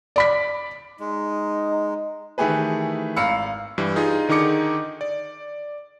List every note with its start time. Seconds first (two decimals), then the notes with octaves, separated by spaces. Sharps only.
0.16 D5 B5 B6
1.00 G#3 D#4
2.38 D#3 E3 A3 G4 G#4 B4
3.17 G#1 F5 A#5 B5 E6 C#7
3.78 G2 E3 G3
3.96 D#4 F4 G#4
4.29 D3 D#3 D#4 G#4 D6 C#7
5.01 D5